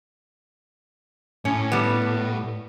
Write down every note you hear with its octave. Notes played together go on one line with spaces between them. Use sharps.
A2 C#4
G3 B3